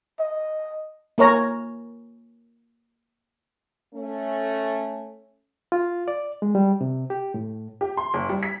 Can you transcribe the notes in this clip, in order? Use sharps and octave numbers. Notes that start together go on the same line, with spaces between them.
D#5
A#3 A#4 C#5 A#5
A3 C#4
F4
D5
G#3
G3
C3
G4
A2
G4
C6
F#1
G3
B6